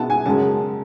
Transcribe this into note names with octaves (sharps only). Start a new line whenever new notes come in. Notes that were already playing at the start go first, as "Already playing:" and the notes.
Already playing: B2 G#3 B3 A5
G#5
F#2 C#3 G#3 A5